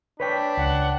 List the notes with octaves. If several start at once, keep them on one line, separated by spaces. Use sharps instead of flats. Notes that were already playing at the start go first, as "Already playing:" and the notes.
D4 B4 C#5 G5 B6
C#2 F#5